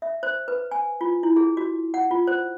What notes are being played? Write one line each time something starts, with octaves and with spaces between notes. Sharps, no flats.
E5
C5
B4
G#5
F4
E4
G#4
F#4
F#5
F4
C5